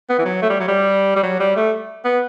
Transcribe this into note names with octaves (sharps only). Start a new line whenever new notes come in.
B3
E3
F#3
A3
G3
F#3
G3
G3
F#3
G3
A3
B3